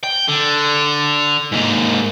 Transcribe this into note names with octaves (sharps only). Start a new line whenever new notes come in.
G5
D3
G#2 A#3